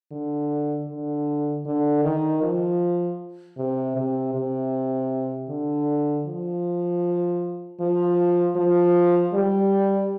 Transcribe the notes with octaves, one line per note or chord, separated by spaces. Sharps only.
D3
D3
D3
D#3
F3
C3
C3
C3
D3
F3
F3
F3
G3